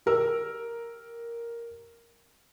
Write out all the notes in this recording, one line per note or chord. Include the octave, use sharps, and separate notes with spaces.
G4 A#4 E6